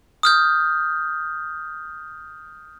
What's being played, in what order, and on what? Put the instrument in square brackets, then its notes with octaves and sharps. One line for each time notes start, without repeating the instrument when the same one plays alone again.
[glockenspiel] D#6 F6 G6